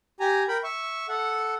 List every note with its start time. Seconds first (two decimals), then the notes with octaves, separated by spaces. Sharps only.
0.20 G4 G#5 A#5
0.48 A#4 G5 B5
0.64 E5 C#6
1.09 A4 F#5